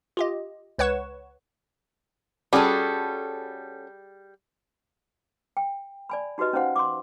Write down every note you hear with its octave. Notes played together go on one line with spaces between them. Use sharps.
F4 G4 D#5
C#2 B4 C#5 F#5 C#6 E7
G3 C#4 F#4 G#4 A4
G5
D5 G#5 B5
D#4 F#4 G4 B4 D#5
C#4 D#4 C5 F5 F#5
C6 D6